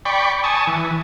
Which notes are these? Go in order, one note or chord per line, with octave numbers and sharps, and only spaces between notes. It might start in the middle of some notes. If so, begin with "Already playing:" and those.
D5 G5 B5 C#6
G#5 A5 C#6 D#6
E3